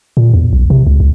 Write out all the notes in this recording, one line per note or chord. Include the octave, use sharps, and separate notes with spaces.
A#2
E2
B1
C3
C#2
C#2